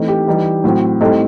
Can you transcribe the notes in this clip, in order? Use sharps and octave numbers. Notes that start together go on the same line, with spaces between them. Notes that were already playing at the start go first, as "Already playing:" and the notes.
Already playing: E3 A3 C4 D#4
G4
E3 G3 D#4
A2 F#3 C4
A2 G3 C4 D#4 A4